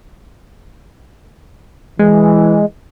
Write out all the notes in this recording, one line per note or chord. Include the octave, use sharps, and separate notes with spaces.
E3 G#3